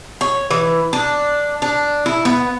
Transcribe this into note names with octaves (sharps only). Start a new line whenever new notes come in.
C#5
E3
D4
D4
E4
B3